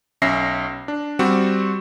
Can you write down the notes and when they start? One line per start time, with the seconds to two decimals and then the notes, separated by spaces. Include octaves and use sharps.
0.22 B1 C#4 E5 A#6 C7
0.88 D4
1.19 G3 C4 F#4